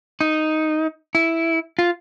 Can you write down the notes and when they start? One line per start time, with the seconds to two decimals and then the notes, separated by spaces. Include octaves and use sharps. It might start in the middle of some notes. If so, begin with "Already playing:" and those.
0.21 D#4
1.15 E4
1.79 F4